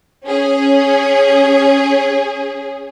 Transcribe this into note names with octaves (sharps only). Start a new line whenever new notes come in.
C#4 G#4